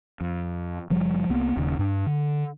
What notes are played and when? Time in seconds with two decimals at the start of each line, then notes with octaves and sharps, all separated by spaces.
0.21 F2
0.90 F#1 F3 G3
1.29 C2 A#3 B3
1.57 D#1 D#2 C#3
1.79 G2 D4
2.06 D3